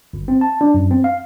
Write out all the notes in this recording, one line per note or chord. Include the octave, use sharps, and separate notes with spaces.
G1
C4
A5
D4
F#2
C4
F5